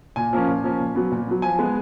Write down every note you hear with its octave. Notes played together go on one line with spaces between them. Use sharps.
A#2 G#5
F3 A#3 C#4
A#2
F3 A#3 C#4
A#2
F#3 B3
A#2
F#3 B3
F3 G#5
G#3 B3